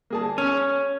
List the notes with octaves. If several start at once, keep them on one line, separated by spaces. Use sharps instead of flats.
A#3 G#4 A5
C#4